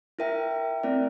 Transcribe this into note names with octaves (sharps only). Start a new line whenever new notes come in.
E4 A#4 E5 G5
A3 C4 E4 A#4 D5